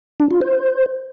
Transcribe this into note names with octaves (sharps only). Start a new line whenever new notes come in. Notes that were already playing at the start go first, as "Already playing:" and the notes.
D4
F4
C5